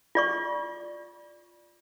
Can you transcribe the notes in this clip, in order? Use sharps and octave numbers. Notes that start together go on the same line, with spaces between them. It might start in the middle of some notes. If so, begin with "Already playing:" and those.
F4 D5 C#6